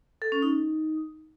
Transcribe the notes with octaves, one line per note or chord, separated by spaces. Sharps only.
A4
C#4
D#4